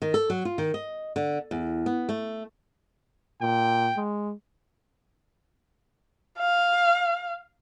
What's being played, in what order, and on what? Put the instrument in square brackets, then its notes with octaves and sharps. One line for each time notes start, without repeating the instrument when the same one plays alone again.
[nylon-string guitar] D#3
A4
F#3
F4
D#3
D#5
D3
E2
B3
A3
[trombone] A#2 [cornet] G5
[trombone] G#3
[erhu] F5